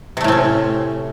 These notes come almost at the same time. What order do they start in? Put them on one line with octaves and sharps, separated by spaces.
C3 A3 A2 C4 C#4